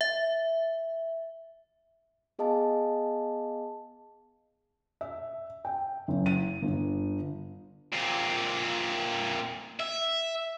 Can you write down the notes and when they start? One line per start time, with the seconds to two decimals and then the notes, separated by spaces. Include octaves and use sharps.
0.01 E5
2.39 B3 G#4 D#5 F5 A5
5.01 E5
5.65 G5
6.08 F#1
6.26 D#7
6.62 G1
7.93 A#2 C4
9.80 E5